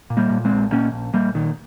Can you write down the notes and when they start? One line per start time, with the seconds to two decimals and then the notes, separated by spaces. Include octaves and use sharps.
0.10 A#2
0.17 G3 A#3
0.30 A#2
0.45 G#3 C4
0.52 A#1
0.72 A#2 A#3 C#4
0.92 A#1
1.13 A#1 G3 A#3
1.35 A#2 D#3